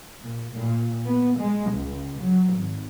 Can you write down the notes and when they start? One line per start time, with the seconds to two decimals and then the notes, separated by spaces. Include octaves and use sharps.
0.22 A#2
0.54 A#2
1.08 B3
1.39 G#3
1.72 C#2
2.22 F#3
2.55 G#1